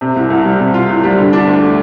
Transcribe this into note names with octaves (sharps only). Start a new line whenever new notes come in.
C3
C2
C2
G3
C3
F4
C2
G3
D3
D4
D2
A3